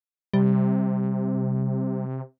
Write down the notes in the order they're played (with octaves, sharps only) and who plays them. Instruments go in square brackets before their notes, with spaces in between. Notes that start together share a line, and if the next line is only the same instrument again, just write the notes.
[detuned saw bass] C3 [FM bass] G3